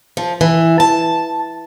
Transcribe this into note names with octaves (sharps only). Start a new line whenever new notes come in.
F3
E3
A5